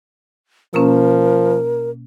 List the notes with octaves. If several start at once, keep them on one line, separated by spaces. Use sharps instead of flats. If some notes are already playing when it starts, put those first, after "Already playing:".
B2 F3 A#3 C#4 A#4